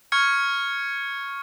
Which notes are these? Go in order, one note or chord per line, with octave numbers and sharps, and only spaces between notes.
C#6 F6 G#6 C#7